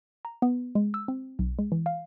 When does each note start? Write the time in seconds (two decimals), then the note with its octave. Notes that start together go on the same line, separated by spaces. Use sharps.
0.25 A#5
0.42 B3
0.75 G#3
0.94 E6
1.08 C4
1.39 B1
1.59 G#3
1.72 E3
1.86 F5